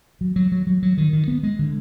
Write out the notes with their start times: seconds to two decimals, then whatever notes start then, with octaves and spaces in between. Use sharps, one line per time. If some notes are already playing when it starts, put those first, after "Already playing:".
0.21 F#3
0.36 F#3
0.52 F#3
0.67 F#3
0.83 F#3
0.97 D#3
1.13 D#3
1.28 B3
1.43 G#3
1.59 D3